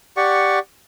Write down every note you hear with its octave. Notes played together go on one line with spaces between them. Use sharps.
G4 D5 F#5 C#6